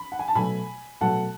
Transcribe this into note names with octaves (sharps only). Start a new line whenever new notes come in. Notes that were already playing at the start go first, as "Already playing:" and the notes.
Already playing: B5
F#5
G#5
A5
B2 F#3 A3 G#5 B5
B2 F#3 A3 F#5 A5